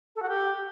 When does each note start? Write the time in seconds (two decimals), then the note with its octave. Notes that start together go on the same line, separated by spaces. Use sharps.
0.15 A4
0.22 F#4
0.28 G4